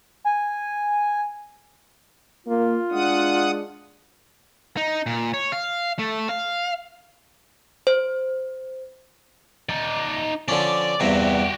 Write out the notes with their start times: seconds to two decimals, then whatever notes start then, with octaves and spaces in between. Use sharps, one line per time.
0.25 G#5
2.47 A#3 F4
2.92 G#3 D4 F#5 D#6
4.77 D#4
5.06 A#2
5.34 C#5
5.52 F5
5.99 A3
6.29 F5
7.87 C5
9.69 D#4 D5
10.48 D3 F3 C#4 D5
11.00 E2 G2 C3 F#4 G4